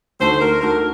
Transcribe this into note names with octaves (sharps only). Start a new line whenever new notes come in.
D2 D3 A3 D#4 F#4 C5
A#4
D2 D3 A3 D#4 F#4 A#4